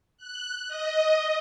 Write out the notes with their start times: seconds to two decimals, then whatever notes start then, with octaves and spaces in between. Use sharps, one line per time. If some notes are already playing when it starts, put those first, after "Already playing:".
0.18 F#6
0.68 D#5